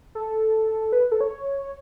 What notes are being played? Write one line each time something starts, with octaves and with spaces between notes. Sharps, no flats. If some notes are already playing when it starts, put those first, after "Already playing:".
A4
B4
A4
C#5